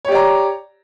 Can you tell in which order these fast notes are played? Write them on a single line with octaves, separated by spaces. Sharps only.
C#5 G4 D5 A#5